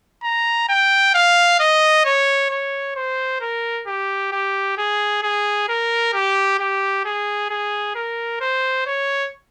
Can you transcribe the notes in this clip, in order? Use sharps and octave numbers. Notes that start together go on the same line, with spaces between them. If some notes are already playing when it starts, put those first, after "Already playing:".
A#5
G5
F5
D#5
C#5
C#5
C5
A#4
G4
G4
G#4
G#4
A#4
G4
G4
G#4
G#4
A#4
C5
C#5